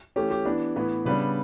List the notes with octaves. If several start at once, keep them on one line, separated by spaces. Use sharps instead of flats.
E3 A3 C#4 G4
G4
E3 B3 D4
A2 E3 B3
C#3 G3 B3 D4 B4